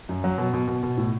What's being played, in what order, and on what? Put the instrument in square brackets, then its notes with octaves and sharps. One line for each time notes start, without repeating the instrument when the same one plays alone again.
[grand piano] F#2
F#3
B2
B2
B2
B2
A2